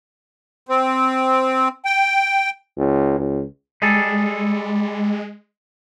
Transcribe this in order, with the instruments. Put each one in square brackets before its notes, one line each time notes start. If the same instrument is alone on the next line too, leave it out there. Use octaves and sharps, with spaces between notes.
[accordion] C4
G5
[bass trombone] C#2
C#2
[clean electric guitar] G3 G#4 A4 [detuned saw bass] G#3